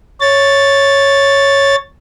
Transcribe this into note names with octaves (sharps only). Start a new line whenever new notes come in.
C#5 A6